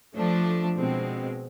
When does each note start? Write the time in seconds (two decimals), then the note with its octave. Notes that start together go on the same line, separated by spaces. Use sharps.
0.15 F3 A3 D4
0.77 B2 G#3 C4